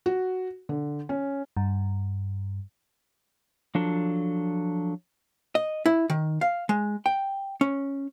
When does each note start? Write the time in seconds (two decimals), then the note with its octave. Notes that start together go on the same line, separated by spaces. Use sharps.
0.06 F#4
0.69 D3
1.09 C#4
1.57 G2
3.75 F3 F#3 D4 A4
5.55 D#5
5.86 E4
6.10 D#3
6.41 F5
6.69 G#3
7.06 G5
7.61 C#4